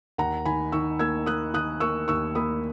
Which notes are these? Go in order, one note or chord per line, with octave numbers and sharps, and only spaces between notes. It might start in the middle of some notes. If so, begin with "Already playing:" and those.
D#2 F#5 A#5
D#3 G#5 B5
D#3 C#6 E6
A#3 E6 G#6
A#3 D#6 F#6
D#3 D#6 F#6
A#3 C#6 E6
D#2 C#6 E6
A#3 B5 D#6